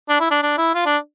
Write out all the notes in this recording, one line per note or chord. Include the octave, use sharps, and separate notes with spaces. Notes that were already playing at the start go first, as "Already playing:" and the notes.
D4
E4
D4
D4
E4
F4
D4